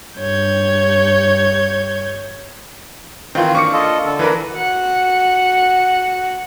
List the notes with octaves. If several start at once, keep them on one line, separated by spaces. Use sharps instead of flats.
G2 C#5 G6 G#6
D#3 E3 C4 F4
A#3 D4 C#6 D6 C#7
F4 A4 D#5
D3 A4
E3 A#3 A#4 B4
F#4 F#5